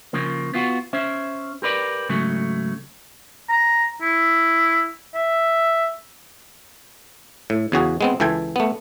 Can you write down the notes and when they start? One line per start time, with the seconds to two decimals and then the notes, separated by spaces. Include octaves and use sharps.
0.13 C#3 F3 A#3
0.54 B3 F4 F#4
0.93 C#4 C5 E5
1.62 G4 A#4 B4 D5
2.09 G#2 C#3 F#3 A3
3.49 A#5
4.02 E4
5.14 E5
7.50 A2
7.72 E2 C#3 F#4 G#4
8.01 G#3 B3 C4
8.20 C#2 E3 A4 G5 G#5
8.56 A3 B3